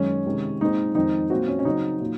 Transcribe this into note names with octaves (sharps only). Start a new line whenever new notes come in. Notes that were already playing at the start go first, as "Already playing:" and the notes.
Already playing: F#2 D#3 G#3 C#4
C3 D#3 G#3
A#2 G#3 C4 D#4
F2 D#3 G#3 C4 D#4
A#2 F#3 C4 F#4
C#4
C#4
C#3 F#3 C4 D#4
A#2 F#3